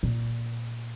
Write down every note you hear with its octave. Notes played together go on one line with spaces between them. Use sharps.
A#2